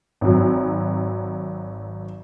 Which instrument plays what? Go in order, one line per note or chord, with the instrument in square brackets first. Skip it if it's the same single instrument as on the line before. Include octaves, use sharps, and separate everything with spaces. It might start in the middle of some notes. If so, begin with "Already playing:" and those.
[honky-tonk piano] G#1 F#3